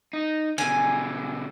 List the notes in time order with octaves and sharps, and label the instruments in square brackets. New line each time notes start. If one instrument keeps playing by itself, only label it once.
[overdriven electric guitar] D#4
[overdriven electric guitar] B2 D3 [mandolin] G#5